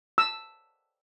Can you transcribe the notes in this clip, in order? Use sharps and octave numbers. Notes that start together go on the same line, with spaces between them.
E6